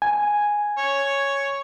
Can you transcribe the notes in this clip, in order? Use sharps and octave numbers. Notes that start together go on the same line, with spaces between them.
G#5
C#5